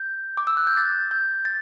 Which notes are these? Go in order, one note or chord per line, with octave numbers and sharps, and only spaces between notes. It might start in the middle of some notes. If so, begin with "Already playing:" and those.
Already playing: G6
D6
E6
F#6
G6
A6
G6
A6